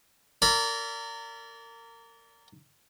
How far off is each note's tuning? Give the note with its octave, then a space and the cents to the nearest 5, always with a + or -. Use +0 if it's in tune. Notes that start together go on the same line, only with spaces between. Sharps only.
A#4 -25 D5 -30 B5 -10